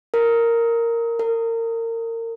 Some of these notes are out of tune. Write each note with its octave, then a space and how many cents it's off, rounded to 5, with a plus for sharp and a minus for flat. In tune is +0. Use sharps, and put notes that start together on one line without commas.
A#4 -10
A#4 -30